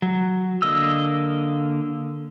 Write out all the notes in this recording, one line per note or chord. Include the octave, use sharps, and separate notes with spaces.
F#3
D3 A#3 D#5 E6